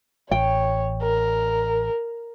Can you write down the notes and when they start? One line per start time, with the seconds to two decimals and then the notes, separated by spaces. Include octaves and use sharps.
0.31 A1 C#5 G5
1.03 A#4